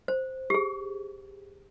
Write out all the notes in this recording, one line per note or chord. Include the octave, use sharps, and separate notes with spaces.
C5
G4
G#4